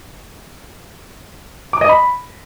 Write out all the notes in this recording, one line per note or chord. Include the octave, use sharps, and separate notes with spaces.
D6
D#5
B5